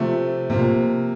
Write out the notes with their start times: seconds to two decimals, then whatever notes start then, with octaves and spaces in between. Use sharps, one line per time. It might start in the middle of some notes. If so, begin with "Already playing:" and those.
Already playing: C3 F3 A3
0.50 C3 F3 A#3